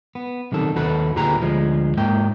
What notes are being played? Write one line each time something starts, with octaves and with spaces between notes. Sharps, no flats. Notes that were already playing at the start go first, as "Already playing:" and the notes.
B3
B1 C3 D#3 A4
D#2 F#4 A4 B4
D2 A#2 G4 G#4 B4 A#5
D2 F3 G#3
G#2 A#3 G5